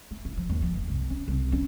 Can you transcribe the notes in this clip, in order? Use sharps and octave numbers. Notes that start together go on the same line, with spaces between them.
A3
E4
F3
D#2
F3
F#1
C2
C#4
C2
C#4